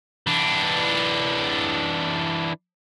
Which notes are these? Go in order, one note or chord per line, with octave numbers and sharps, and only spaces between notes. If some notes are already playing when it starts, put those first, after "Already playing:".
E3 D4